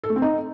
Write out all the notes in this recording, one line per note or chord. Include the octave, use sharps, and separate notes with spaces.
A4
A3
C4
D#4